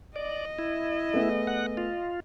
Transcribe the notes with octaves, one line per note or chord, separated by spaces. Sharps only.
D5 D#5
E4
A3 B3 G#4
F#5
F4